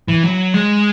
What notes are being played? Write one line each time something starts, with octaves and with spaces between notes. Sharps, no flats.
E3
F#3
G#3